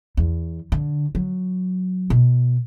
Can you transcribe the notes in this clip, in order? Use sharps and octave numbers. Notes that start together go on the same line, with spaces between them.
E2
D3
F#3
B2